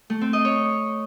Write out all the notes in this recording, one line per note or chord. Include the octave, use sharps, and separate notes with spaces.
A3
C4
D#5
C#5